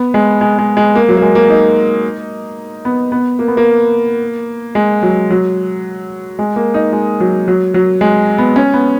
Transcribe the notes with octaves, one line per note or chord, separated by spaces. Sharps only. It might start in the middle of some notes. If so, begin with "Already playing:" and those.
Already playing: B3
G#3
G#3
G#3
G#3
A#3
F#3
A#3
G#3
A#3
D#4
B3
B3
A#3
B3
A#3
G#3
F#3
F#3
G#3
A#3
D#4
G#3
F#3
F#3
F#3
G#3
B3
C#4
B3